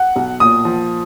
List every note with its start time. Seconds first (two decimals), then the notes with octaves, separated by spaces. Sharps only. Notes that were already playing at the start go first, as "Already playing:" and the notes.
Already playing: F#5
0.16 B1
0.40 A#2 D#6
0.65 F3